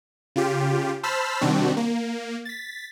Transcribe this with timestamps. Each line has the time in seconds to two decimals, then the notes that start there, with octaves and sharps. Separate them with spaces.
0.36 C#3 F4 G4
1.03 C5 A5 B5 E6 F6 B6
1.41 C3 D#3 G3 C4 D4 F#4
1.77 A#3
2.45 A6 B6